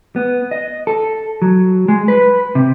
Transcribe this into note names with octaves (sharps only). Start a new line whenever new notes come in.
B3
D#5
A4
F#3
G#3
B4
C3